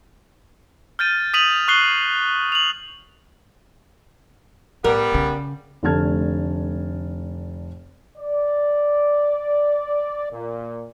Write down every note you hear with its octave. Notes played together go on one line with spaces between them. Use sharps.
F6 G6 A6 D#7
D#6 B6 D#7 F7 F#7
C#6 F#6 C7 G7
F7 F#7
A2 G3 B3 A#4
C#3
F1 D3 A3 A5 F6 G#6
D5
A#2